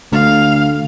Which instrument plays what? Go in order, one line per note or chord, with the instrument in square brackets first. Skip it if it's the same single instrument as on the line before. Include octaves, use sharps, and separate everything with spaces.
[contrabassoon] D2 [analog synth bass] D3 [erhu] F5